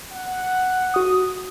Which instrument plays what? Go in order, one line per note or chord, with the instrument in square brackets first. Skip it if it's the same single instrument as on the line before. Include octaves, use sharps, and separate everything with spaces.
[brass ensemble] F#5
[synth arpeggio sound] F#4 D#6